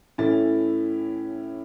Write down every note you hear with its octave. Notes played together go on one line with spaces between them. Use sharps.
A2 E3 A3 C#4 E4 A6